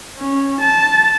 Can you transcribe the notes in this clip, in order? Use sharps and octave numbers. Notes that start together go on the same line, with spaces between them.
C#4
A5